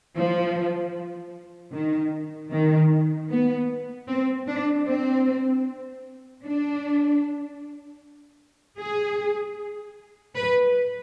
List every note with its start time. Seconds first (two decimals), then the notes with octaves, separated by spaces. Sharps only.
0.17 F3
1.74 D#3
2.52 D#3
3.30 B3
4.08 C4
4.48 D4
4.86 C4
6.43 D4
8.79 G#4
10.35 B4